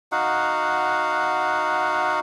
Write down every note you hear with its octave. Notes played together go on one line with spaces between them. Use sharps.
D#4 F#4 F5 F#5